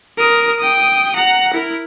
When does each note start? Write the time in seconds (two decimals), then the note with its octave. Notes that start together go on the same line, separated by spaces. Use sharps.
0.18 A#4 D#6
0.59 G5 D#6
1.15 F#5 A#5
1.53 E4 A#4